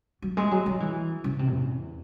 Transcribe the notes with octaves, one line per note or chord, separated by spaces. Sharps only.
F#3
G#3
F#3
F#3
E3
C#3
C3
E2